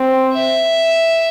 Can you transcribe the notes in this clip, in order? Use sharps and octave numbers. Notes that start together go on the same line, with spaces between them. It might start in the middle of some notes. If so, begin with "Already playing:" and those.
Already playing: C4
E5